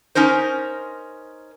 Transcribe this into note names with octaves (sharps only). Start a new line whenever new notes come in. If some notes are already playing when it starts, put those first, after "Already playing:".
C#4 D#4 A#4 C5